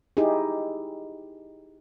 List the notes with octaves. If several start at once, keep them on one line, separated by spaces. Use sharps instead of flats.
D#4 E4 G4 G#4